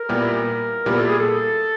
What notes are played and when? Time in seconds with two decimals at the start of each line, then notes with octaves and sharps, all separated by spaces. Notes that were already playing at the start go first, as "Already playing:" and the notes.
Already playing: A#4
0.09 A#2 G3 B3 E4 G4
0.86 A#2 G3 B3 E4 G4 A#4
0.97 A4
1.08 G#4
1.19 A4